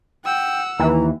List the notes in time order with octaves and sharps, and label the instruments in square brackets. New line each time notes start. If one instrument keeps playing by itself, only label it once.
[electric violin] F#5 E6 [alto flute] G5
[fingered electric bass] D#2 [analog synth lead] E3 [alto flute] A#5